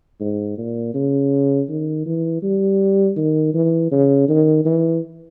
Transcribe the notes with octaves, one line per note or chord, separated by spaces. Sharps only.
G#2
A#2
C#3
D#3
E3
G3
D#3
E3
C#3
D#3
E3